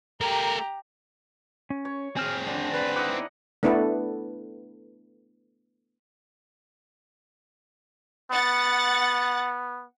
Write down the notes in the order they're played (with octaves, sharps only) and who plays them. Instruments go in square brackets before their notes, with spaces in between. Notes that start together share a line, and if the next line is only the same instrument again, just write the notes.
[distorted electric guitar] A3 A#4 [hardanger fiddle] G4 A#5
[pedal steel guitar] C#4
[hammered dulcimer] C#5
[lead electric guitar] C4 G#4 [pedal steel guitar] G#5 F6
[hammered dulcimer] D3 [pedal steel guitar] D4
[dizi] B4 [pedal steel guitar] D5
[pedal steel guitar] D#4 E4 D5 [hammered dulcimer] D#5 F#5
[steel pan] A3 B3 D4 E4 A4 B4
[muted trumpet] B3 [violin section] F#5 A6